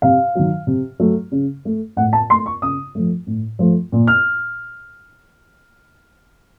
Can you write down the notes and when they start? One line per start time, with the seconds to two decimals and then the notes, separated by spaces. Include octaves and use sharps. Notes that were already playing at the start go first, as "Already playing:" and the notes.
0.02 C3 F5
0.35 D#3 F#3
0.67 C3
1.00 F#3 A3
1.32 C#3
1.65 A3
1.97 A2 F#5
2.13 A5
2.29 A3 C6
2.46 C#6
2.62 C#3 D#6
2.95 F3 A3
3.27 A2
3.59 F3 A3
3.92 A#2
4.07 F6